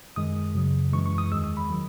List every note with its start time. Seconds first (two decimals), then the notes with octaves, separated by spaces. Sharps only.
0.16 F#2 D#3 G#3 D#6
0.55 F#2 C#3 F#3
0.93 F#2 E3 G#3 C#6
1.06 C#6
1.18 D#6
1.32 E2 D#3 G#3 E6
1.44 D#6
1.57 B5
1.71 D#3 F#3